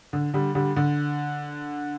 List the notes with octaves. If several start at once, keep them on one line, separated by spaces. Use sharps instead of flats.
D3
D3 G3
D3 G3
D3